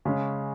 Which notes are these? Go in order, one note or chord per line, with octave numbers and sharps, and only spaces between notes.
C#3 G#3 C#4